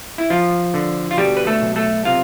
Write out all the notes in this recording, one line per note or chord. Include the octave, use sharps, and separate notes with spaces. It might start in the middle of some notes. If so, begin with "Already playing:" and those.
E4
F3 F4
D3
F4
B2 G3 G4
B4
A3 A4
B1
A3 A4
C3 F4 F5